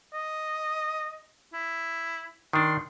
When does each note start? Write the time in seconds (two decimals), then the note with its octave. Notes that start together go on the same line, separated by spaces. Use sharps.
0.13 D#5
1.53 E4
2.53 D#3 D4 C6